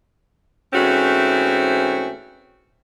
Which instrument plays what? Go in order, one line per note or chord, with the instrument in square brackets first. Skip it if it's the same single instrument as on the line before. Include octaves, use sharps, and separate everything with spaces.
[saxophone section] G#2 E3 A3 C4 C#4 F#4